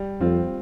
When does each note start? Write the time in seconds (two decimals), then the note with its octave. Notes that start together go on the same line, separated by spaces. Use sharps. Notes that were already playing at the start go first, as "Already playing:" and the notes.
Already playing: G3
0.21 F2 C4 F4